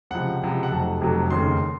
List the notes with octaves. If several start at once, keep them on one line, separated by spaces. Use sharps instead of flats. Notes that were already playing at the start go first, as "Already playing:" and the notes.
C#2 C3 F3 F#5
C#2 C3 F3
F#5
F1 F2 C3 F#3 A5
F1 F2 C3 F#3
F1 D#2 C#3 C6